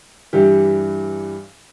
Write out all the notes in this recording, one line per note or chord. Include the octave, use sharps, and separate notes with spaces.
G2 E3 G3 G4